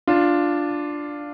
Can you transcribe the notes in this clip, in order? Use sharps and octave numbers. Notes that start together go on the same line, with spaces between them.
D4 F4